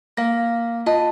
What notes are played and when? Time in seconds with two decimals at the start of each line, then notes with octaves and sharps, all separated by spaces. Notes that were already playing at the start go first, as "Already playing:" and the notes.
0.17 A#3 F5 A#6
0.87 F4 D#5 A5